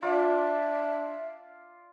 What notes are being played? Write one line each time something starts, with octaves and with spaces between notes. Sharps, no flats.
D4 F4 D5 E5